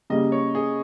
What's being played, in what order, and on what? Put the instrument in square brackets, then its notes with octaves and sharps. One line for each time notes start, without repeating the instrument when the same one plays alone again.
[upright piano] C#3 G3 A#3 [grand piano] D#5
[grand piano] C#5
G#4